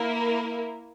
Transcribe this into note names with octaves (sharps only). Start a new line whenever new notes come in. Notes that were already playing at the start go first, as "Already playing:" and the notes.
Already playing: A#3 E4 A#4